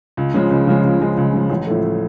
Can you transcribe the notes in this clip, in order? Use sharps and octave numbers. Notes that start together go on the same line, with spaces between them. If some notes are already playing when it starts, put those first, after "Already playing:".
C#2
C#3 F3 G#3
C#2
C#3 F3 G#3
C#2
C#3 F3 G#3
C#2
C#3 F3 G#3
A1
A2 F3 A3